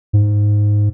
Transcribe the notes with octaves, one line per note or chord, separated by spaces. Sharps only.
G#2